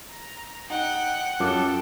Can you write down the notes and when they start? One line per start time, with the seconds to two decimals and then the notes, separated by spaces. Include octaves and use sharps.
0.10 A#5
0.70 D#4 F#5 G5
1.40 F#2 F3 A4 G5 D6 F#6